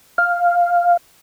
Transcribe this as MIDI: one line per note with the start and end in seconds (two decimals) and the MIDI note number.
0.18 0.97 77